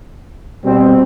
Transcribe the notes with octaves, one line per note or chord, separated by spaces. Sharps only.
B2 G3 C4